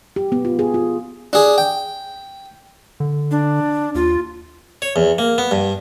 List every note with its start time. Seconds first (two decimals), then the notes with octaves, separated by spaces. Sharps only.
0.16 G4
0.32 B3
0.45 F4
0.59 G#4
0.74 F4
1.33 D4 G#4
1.58 G5
3.00 D3
3.31 D4
3.95 D#2 F4
4.82 C#5
4.96 E2
5.18 A#3
5.38 B3
5.51 G2